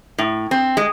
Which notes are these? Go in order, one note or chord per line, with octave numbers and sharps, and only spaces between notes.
A2
C4
G#3